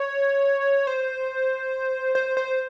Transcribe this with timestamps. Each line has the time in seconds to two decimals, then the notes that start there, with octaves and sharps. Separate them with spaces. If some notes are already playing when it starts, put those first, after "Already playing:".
Already playing: C#5
0.87 C5
2.15 C5
2.37 C5